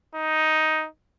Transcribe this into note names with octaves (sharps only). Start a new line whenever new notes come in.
D#4